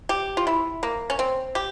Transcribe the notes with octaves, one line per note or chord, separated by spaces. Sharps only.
G4
F4
E4
A#3
C#4
C4
G4